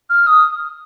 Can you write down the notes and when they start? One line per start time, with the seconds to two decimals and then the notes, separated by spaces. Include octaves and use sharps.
0.10 F6
0.27 D#6